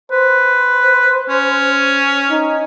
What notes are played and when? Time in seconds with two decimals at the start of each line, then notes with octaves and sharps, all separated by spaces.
0.11 B4 C5
1.29 C#4
2.30 D#4